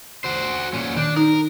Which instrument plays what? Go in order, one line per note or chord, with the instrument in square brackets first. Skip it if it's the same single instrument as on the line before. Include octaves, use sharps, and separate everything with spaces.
[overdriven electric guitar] F#4 C5
A#2 C#4
[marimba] D#3 [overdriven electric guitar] D4
[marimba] D#4 [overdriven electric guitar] A#4